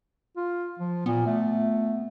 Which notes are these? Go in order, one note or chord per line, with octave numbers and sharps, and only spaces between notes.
F4
F3
A#2 B3
A3